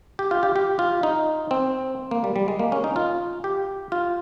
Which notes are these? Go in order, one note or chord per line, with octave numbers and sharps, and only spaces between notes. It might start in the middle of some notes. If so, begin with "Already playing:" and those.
G4
F4
G4
G4
F4
D#4
C4
A#3
G3
G3
G#3
A#3
C#4
D#4
F4
G4
F4